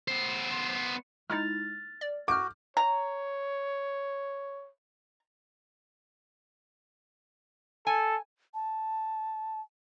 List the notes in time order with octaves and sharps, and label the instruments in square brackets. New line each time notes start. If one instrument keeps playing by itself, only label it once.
[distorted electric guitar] B3 C5
[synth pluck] G#3 D#4 E4 [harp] F6 A6
[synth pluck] D5
[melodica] F#4 [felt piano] D6 [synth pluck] F6 G6
[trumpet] C#5 [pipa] A#5
[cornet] A4 [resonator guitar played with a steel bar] G#5
[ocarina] A5